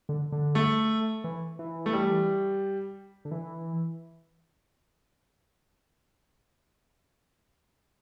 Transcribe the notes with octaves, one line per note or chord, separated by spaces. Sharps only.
D3
D3
A3
E3
E3
A3
G3
D3
E3